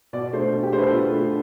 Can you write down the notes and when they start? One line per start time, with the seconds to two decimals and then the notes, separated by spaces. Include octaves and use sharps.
0.13 B2 D5
0.33 A3 D4 C5
0.53 B2
0.63 G4
0.72 A3 D4 C5
0.78 B4
0.83 A4
0.92 B2 F4
1.12 A3 D4